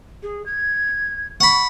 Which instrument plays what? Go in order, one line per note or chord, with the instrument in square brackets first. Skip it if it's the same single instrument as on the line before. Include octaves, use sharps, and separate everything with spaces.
[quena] G#4
G#6
[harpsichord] F#5 B5 [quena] C#6